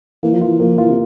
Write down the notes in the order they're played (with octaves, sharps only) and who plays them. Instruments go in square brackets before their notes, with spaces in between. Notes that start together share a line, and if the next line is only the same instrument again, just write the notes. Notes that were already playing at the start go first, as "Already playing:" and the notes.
[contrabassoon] E3 [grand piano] A#3
[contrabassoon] F3
[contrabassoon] E3 [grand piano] F4
[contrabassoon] F3 [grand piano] A#3
[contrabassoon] E3 [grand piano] F4
[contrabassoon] C3